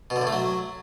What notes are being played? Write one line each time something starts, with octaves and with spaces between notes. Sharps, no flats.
B2
D3
A2
A3
F#3